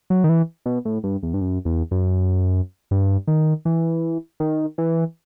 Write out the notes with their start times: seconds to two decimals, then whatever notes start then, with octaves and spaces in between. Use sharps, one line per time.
0.10 F#3
0.24 D#3
0.29 E3
0.66 B2
0.85 A2
1.04 G2
1.23 E2
1.34 G2
1.41 F#2
1.65 E2
1.91 F#2
2.91 G2
3.28 D#3
3.65 E3
4.40 D#3
4.78 E3